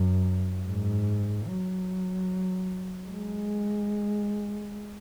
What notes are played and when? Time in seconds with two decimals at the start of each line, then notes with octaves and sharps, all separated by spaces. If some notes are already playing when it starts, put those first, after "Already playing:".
Already playing: F#2
0.67 G#2
1.47 F#3
3.10 G#3